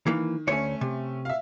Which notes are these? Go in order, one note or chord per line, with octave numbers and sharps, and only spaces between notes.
D#3 E3 A#3
D2 A3 C#4 C#5
C3
E5 F5